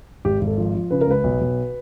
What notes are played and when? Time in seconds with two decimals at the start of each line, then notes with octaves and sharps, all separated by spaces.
0.25 G#1 G4
0.41 G#1
0.47 A4
0.58 F3
0.75 F3
0.91 C#3 B4
1.01 A#4
1.07 C#2 B4
1.24 B1
1.41 B1